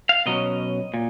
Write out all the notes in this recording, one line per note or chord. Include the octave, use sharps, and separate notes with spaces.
F5
B2 F#3 C#4 D#5
A#2